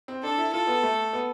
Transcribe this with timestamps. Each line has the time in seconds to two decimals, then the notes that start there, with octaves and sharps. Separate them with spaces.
0.08 C4
0.23 D4 A4
0.38 E4
0.53 F4 A4
0.67 B3
0.83 A3
1.13 B3